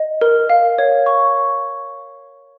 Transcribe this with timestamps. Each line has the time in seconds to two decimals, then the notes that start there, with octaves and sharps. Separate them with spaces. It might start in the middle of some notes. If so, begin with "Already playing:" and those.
Already playing: D#5
0.21 A#4
0.50 F5
0.78 C#5
1.06 C#6